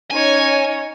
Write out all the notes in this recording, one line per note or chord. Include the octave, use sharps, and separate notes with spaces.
C#4 D#4 C#5 G#5